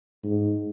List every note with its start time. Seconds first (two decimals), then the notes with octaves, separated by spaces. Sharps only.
0.24 G#2